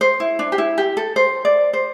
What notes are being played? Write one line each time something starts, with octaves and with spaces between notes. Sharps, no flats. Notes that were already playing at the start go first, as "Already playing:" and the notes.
C5
E4
D4
G4
E4
G4
A4
C5
D5
C5